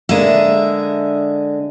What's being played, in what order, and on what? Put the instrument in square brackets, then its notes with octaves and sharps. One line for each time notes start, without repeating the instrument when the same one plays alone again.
[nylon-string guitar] D3 G#3 A#3 [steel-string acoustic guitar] E5